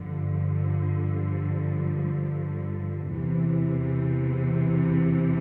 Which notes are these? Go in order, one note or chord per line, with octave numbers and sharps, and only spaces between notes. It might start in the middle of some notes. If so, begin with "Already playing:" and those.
Already playing: G2 D3 F3
E2 C3 E3